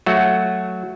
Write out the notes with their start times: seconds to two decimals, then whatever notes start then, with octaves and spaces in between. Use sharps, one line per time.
0.06 F#3 A3 F#4